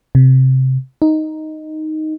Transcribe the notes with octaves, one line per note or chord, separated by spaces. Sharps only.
C3
D#4